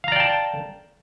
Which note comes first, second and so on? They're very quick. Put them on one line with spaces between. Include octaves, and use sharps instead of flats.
F5 A#5 D5 G5 A5